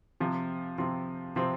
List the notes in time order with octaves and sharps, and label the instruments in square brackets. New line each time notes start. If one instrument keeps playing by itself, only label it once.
[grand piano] C3 F3 C4
C3 F3 C4
C3 F3 C4